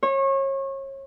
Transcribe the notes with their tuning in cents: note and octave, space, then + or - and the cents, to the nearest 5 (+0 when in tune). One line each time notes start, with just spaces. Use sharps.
C#5 -30